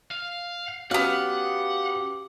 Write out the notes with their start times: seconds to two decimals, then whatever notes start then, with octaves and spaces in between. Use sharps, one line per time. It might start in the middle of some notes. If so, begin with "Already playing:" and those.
0.11 F5
0.91 B3 C#4 F#4 G4 F5 F#5